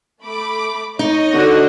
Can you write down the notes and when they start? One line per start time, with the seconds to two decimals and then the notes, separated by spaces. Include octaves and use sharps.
0.25 A3 B5 D6
0.99 D#4 C#5 D#5
1.33 D3 F#4